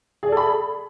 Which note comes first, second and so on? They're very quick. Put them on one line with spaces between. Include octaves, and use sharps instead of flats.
G#4 D5 A4 B5